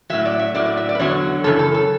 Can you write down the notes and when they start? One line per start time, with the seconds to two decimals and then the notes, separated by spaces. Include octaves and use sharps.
0.10 A2 F#3 E5
0.25 D5
0.39 E5
0.55 A2 F#3 D5
0.66 D5
0.77 E5
0.89 D5
0.95 B4
1.00 E2 D3 F#3 C#5
1.44 F#2 C#3 E3 A4
1.59 A4
1.74 A4